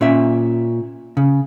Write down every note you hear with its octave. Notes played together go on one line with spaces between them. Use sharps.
A#2 C#4 E5
C#3